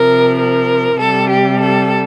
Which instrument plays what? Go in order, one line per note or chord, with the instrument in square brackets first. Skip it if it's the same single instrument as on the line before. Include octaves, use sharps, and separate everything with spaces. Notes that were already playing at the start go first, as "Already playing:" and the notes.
Already playing: [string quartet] C3 F3 A#4
A#4
C3 G3 A4
G4
A4